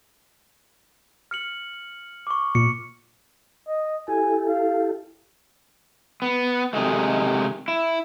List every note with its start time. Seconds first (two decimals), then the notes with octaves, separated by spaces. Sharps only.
1.31 F6 C#7 F#7
2.27 C#6 D6
2.55 A#2 C#7
3.67 D#5
4.08 E4 G4 A4 G#5
4.48 F5
6.22 B3
6.73 C3 D#3 G#3 A3
7.68 E4